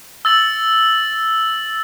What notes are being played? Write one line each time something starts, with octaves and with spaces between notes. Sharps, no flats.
E6 A6 F#7